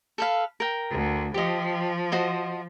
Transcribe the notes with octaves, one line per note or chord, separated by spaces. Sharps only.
A4 B4 F5
A#4 G5
D2
F3 G4 D#5
F#4 C5 D#5